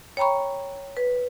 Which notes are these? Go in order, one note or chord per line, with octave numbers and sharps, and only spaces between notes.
C#5 G5 A#5 B5 C#6
B4